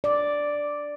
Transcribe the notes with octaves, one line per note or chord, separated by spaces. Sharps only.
D5